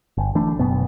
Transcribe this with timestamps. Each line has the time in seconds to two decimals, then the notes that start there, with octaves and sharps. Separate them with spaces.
0.18 G1
0.35 E3 A3 D4
0.59 F#1 F#2 B2 B3